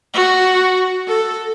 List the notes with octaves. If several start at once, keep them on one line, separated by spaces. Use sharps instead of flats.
F#4
A4